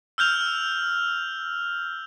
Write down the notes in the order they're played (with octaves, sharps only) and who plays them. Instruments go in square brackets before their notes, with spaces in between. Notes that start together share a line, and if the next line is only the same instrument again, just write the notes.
[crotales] E6 F6 G6 F7